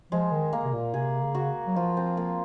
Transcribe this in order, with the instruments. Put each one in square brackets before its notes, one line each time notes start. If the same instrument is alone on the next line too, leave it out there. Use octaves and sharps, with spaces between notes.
[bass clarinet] F3 [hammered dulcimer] G#3
[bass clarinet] D#3
[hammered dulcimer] A#3
[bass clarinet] C3
A#2
[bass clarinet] C3 [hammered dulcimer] G#4
[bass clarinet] C#3
[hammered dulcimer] F#4
[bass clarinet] F#3
[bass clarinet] F3 [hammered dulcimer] F4
[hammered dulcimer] C4
A#3